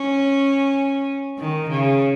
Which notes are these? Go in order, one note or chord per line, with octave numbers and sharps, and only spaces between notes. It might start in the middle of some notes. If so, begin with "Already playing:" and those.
Already playing: C#4
D#3
C#3